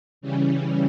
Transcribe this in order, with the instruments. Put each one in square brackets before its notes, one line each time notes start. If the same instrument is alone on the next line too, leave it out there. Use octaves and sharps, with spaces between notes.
[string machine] C#3 E3 G3 C#4